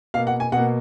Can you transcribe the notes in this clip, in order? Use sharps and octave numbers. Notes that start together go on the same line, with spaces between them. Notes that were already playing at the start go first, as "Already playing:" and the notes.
B2 A#3 F5
F#5
G#5
B2 A#3 F#5